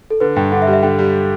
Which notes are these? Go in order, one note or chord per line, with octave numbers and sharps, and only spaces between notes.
A4
D3 B4
G2 G5
D3 F#5
E5
G3
E5
D3 G5
G3